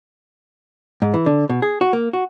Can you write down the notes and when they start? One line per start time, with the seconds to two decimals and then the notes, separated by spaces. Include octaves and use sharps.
1.02 G#2
1.14 E3
1.26 D3
1.49 B2
1.62 G#4
1.81 F#4
1.93 A#3
2.13 F#4